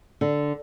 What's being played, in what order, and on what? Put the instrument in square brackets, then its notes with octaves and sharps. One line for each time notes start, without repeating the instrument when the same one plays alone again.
[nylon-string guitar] D3